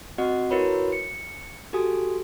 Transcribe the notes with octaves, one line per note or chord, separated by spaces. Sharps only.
C4 F#4 D#5 F#5
E4 F#4 A#4 B4 C#5 B5
C#7
F#4 G4 A4 G#5 D#6